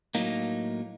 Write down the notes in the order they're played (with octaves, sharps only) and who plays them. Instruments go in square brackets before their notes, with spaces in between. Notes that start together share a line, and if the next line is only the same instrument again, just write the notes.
[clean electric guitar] A2 F#3 A#3 D#4